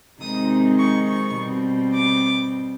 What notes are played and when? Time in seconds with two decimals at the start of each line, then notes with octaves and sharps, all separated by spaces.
0.20 C3 D#3 G#3 C4 D#4 D#6
0.78 C#6
1.07 C#6
1.36 B2 G3 C4
1.94 D6